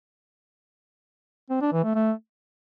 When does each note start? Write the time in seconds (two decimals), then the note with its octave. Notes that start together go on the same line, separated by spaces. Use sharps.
1.50 C4
1.61 D4
1.72 E3
1.84 A3
1.95 A3